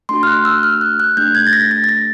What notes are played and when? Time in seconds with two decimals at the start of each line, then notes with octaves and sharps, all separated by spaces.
0.09 A3 D4 F#4 C6
0.23 F6
0.27 F#6
0.45 E6
0.63 F6
0.81 F#6
1.00 F#6
1.17 A3 D4 G4 G6
1.35 G#6
1.47 A6
1.53 A#6
1.71 A6
1.84 A6
1.89 A#6